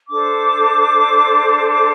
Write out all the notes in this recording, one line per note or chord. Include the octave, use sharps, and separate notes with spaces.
D4 A4 C5 D6
D6